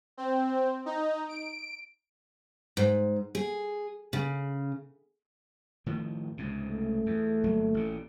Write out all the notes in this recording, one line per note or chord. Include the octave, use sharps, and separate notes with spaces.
C4
D#4
D7
G#2
G#4
C#3
A2 D#3 F3
C#2 G#2 C3
A3
E2
G1 F#3 A#3
A1 A#2